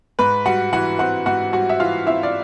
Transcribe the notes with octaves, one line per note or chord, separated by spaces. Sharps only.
G#2 B4 B5
G3 F#4 F#5
E3 F#4 F#5
C4 F#4 F#5
G#2 F#4 F#5
G3 F#4 F#5
E5
E3 F4 F5
C4 E4 E5
D5